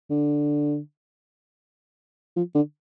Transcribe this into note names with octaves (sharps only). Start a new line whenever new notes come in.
D3
F3
D3